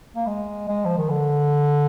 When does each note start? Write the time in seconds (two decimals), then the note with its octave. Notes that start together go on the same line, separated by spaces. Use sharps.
0.16 A#3
0.27 G#3
0.68 G#3
0.85 F3
0.98 D#3
1.10 D3